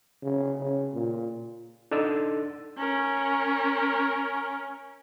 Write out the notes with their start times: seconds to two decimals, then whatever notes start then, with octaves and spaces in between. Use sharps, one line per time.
0.22 C#3
0.59 C#3
0.93 A#2
1.91 D4 D#4 A4 E6 A6
2.77 C#4 A#4